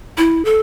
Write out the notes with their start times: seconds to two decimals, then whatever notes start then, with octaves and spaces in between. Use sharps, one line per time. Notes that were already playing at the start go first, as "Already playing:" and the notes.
0.18 E4
0.45 A4